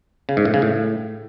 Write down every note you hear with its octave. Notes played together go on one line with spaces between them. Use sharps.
C#3
G#2
A2
C#3
A2